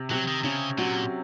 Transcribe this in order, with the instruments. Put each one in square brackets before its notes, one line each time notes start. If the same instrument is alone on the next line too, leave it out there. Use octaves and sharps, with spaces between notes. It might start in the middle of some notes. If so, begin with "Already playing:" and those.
Already playing: [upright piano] C3
[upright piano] C3 [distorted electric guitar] F#3
[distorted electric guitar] D#3
[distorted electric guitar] C#3 [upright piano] C#4
[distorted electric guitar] A#2 [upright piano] F#3